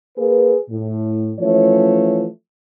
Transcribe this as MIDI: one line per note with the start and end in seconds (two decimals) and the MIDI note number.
0.17 0.57 58
0.17 0.57 68
0.17 0.57 71
0.70 1.33 45
1.39 2.25 52
1.39 2.25 53
1.39 2.25 57
1.39 2.25 61
1.39 2.25 73